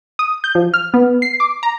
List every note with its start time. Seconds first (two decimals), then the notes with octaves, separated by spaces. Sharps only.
0.19 D#6
0.44 G6
0.55 F3
0.74 F6
0.94 B3
1.22 C7
1.40 D6
1.63 A#5